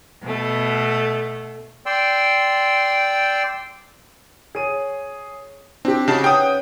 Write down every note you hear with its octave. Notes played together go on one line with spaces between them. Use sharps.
B2 A3
D5 G5 C6 E6
G#4 C#5 D#7
C4 D4 G4
C#3 D#4 F#4 A5
C#4 B4 F#5 G5 D#6